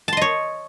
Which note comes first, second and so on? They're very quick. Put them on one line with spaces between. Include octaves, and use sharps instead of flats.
A5 C6 D#5 C#5